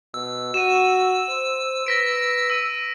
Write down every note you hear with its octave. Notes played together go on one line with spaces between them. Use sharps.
B2 E6
F#4 D#7 E7
C5
B4 A#6 B6 D7
E6 D#7